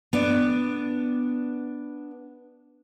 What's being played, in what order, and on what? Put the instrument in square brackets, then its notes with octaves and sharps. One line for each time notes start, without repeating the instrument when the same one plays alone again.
[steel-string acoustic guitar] B3 D4